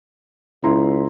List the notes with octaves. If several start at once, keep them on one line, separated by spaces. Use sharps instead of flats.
C#2 E4 A#5 C6